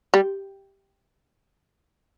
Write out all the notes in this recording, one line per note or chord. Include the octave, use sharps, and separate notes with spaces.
G3